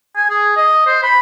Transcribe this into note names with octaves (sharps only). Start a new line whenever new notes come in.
G#5
G#4
D#5
C5
B5